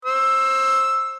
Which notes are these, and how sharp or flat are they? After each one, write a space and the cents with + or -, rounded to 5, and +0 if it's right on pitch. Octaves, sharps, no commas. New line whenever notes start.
C5 +30 E6 +0